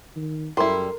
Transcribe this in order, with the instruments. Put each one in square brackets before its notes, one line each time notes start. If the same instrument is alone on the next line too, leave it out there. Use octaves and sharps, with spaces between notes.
[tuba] D#3
[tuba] F#2 [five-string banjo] G3 E4 [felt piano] A4 A#4 [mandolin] C6